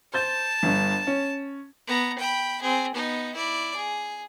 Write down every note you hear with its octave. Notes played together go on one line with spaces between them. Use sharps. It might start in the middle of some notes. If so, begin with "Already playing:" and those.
C5 A5 G6 A6
G1 G2
C#4
B3 A#5
G5 B5
C4 G#4
B3 D#4
E4 D5
G#4